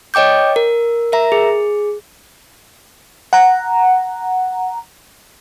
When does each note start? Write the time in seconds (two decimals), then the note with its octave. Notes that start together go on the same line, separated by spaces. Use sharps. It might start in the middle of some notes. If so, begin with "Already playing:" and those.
0.14 C#5 D#5 G5 D6 G6
0.56 A#4
1.12 A#4 E5 A#5
1.32 G#4
3.33 F#5 A#5